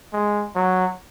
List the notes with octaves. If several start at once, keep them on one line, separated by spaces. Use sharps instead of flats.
G#3
F#3